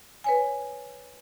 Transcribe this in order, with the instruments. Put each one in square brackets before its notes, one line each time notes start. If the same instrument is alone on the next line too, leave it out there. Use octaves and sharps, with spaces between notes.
[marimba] B4 C#5 G#5